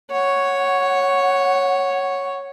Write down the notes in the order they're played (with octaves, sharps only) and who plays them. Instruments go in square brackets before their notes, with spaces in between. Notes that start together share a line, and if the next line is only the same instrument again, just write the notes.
[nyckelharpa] C#5 [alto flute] F#5